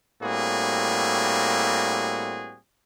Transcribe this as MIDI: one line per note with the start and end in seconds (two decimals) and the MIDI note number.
0.22 2.57 45
0.22 2.57 55
0.22 2.57 58
0.22 2.57 60
0.22 2.57 66
0.22 2.57 68